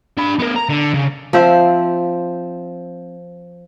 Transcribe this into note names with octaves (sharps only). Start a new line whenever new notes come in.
D4 B5
B3 A#4
A#5
D3
C#3
F3 C4 C5 E5